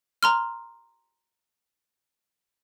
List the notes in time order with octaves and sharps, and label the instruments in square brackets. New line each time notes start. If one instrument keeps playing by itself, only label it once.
[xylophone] A#5 C6 F6